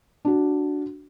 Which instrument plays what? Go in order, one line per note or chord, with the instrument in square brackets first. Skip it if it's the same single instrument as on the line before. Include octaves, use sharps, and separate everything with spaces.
[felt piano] D4 F#4